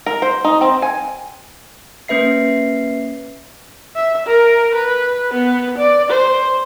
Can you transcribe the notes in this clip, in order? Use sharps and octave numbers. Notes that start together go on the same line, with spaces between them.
A#4
C5
D#4
C4
G#5
A#3 C#4 B4 E5 C7
E5
A#4
B4
B3
D5
C5